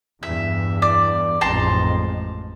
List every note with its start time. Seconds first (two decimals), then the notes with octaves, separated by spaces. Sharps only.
0.23 E2 G2 E5
0.82 D5
1.41 A1 F2 G#2 A5 A#5 C6